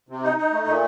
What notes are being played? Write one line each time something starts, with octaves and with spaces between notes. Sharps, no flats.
C3
D#4
D#4
A3
A#2